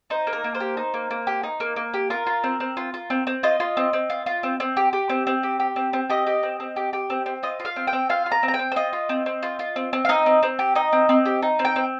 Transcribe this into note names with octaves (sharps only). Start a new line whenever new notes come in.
D#4 C5
A#3
A#4
A#3
C5
G4
D#4
A#3
A#3
G4
D#4
A#3
A#3
G4
F4 A#4
F4
C4
C4
F4
F4
C4
C4
F4 D#5
F4
C4
C4
F4
F4
C4
C4
G4
G4
C4
C4
G4
G4
C4
C4
G4 D#5
G4
C4
C4
G4
G4
C4
C4
F4 D#5
F4
F5
C4
G5
C4
F4 F5
F4
A#5
C4
A#5
G5
C4
C5
F4 D#5
F4
C4
C4
F4
F4
C4
C4
F5
D#4 D#5
C4
C4
G4
D#4 D#5
C4
C4
G4
D#4
C4
G5
C4